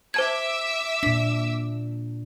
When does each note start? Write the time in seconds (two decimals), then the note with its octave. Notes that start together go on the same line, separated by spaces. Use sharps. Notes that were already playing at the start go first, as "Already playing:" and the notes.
0.14 C5 E5 A5 D6 E6 G#6
1.03 A#2 D4 B6